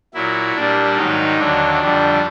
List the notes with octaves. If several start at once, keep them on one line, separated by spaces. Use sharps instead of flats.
A#2 F#3 E4
A#2 G3 D4
G#2 D#3 F#3 D#4
D#2 D3 F#3 D4
F2 D3 G3